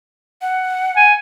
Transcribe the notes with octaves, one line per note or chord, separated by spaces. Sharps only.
F#5
G#5